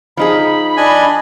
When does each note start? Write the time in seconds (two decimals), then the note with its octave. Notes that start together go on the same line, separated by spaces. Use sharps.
0.17 F3 D#4 G#4 B5
0.77 D4 D#5 G#5